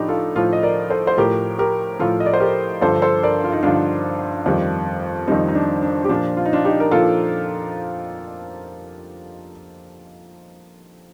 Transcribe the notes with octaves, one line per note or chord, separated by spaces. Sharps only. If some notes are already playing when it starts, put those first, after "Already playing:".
Already playing: A2 F3 D4 D#4 G4
F4 A4
A2 F3 F4 A4
D#5
A#4 D5
A4 C5
C5
A2 F3 G4 A#4
G4 A#4
A2 F3 F4 A4
D#5
D5
C5
G4 A#4
G2 D3 F3 A4 C5
A4 C5
A#4 D5
F4
D#4
G2 D3 F3 D4 F4
F2 D#3 G3
F2 D#3 G3 C4 D#4
D#4
D4
D4
G4
A#2 F3 D4 F4
F4
D#4
D4 F4
D#4 G4
A#4
A#2 F3 F4 A4